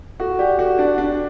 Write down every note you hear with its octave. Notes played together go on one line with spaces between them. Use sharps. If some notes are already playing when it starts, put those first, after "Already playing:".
F#4 A4
G4 D5 F#5
F#4 A4
D4 D5 F#5
D4 F#4